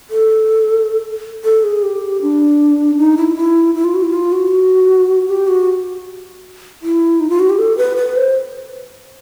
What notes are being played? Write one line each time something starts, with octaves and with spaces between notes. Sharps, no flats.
A4
A4
G#4
G4
D4
D#4
E4
E4
E4
F4
F#4
E4
F4
F#4
G4
F#4
E4
D#4
F4
F#4
G4
A4
B4
B4
C5